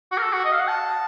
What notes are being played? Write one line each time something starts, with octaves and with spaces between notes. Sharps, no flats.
F#4
A#4
A4
F#4
D#5
F5
F#5
A5